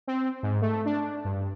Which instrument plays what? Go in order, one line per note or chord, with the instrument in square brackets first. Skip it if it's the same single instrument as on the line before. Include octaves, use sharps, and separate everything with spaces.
[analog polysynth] C4
G#2
A3
D4
D4
G2